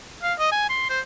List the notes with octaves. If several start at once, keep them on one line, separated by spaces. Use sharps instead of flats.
F5
D#5
G#5
C6
C5